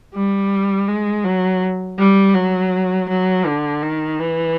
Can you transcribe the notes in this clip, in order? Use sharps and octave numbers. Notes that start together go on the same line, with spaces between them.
G3
G#3
F#3
G3
F#3
F#3
D3
D#3
E3